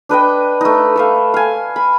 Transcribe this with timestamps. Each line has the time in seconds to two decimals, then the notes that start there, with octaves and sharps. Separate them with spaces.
0.09 D4 B4 D#5 G5
0.61 A3 D#4
0.96 A4 E5 F5
1.34 F5 G#5
1.76 B5